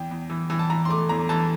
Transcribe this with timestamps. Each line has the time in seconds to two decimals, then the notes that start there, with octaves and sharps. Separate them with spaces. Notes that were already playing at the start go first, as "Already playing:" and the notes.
Already playing: E2 G5
0.11 E2
0.30 E3
0.50 E3
0.59 A5
0.70 E3 A#5
0.85 C6
0.89 A3 D6
1.09 E2 A#5
1.29 E3 A5